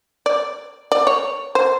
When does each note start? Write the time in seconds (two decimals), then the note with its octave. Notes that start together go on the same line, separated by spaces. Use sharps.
0.26 D5
0.92 D5
1.07 C#5
1.55 C5